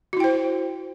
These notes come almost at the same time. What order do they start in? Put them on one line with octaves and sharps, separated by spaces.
F#4 E4 G5 C5